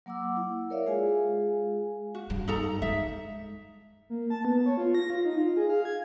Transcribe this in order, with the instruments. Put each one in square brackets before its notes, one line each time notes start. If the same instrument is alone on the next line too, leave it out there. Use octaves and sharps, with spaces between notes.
[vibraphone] F#3 A#3 F#5 D6 E6
E4
A#4 C#5 D5 E5 F5
G#3 F4 G#4 F5 G#5
[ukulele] F#4
[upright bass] G2
[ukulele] D#4 A4 A#5
[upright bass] G#3 [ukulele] D#4 E5
[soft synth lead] A#3
A5
B3
C#5
F4
A#6
F4
D#4
F4
G#4
F5
G#6